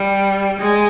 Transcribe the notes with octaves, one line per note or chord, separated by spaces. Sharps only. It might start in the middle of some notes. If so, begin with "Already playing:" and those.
Already playing: G3
G#3